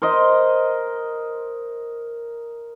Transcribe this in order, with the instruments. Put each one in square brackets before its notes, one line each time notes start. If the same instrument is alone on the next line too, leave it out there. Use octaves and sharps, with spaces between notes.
[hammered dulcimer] A#4 C5 D#5